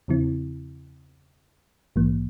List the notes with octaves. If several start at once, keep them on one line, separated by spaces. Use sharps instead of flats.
E2 C#3 F3 C4 E4
A#1 G#2 E3 A#3